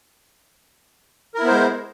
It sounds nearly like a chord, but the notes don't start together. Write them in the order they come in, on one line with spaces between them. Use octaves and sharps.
A#4 E4 B3 C5 G#3